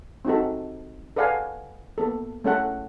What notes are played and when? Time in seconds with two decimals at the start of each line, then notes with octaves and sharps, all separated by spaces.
0.25 C4 D#4 F#4 A4
1.16 A4 B4 D5 F5 F#5 G#5
1.98 A#3 B3 A4
2.44 A3 C#4 A4 F#5